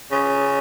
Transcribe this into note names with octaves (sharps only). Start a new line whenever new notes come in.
C#3